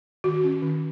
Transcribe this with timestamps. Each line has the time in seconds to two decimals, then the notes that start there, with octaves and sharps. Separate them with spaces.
0.24 D#3 F#4
0.44 C#4
0.62 D#3